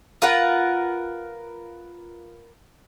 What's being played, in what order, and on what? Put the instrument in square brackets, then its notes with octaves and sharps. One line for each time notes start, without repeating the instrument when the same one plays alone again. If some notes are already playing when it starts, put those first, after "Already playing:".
[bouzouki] F4 A#4 B4 F#5